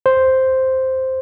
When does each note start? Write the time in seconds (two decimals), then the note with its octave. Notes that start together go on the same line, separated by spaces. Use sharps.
0.06 C5